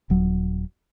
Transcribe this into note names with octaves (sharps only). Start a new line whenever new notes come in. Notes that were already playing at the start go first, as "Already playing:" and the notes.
D#1 F#3